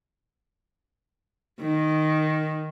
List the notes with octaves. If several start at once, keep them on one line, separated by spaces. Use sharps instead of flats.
D#3